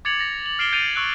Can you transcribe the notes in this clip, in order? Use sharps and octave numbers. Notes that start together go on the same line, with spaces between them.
D6 G#6 A6 C#7 F7 F#7
A6 A#6
F#7
F6 C7 D7 E7 G7
G6 A6 C7 D7 D#7 F7
C#6 E6 F#6 D7 F#7